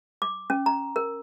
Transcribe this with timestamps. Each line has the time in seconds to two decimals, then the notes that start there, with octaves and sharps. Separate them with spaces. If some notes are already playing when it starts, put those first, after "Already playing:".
0.22 D6
0.50 C#4
0.66 A#5
0.96 A#4